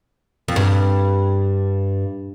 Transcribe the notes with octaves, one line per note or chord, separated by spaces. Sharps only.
F2
G2